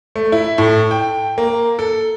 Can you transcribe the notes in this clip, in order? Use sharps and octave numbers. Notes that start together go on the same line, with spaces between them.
A3
E4
A2
G5
A#3
A4